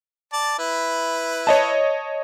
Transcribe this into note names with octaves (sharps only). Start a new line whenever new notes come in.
D5 A5
E4 B4
C#5 D#5 A5